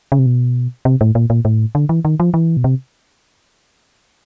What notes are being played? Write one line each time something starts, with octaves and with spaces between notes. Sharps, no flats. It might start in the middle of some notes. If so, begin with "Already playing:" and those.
C#3
C3
B2
C3
A2
A#2
A#2
A2
D3
E3
D#3
F3
E3
B2
C3